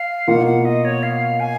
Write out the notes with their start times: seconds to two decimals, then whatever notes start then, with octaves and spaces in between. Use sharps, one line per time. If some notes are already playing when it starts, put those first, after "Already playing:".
Already playing: F5
0.27 B2 A#3 F4 F#5
0.46 F#5
0.64 D#5
0.84 C#5
1.02 F5
1.39 G#5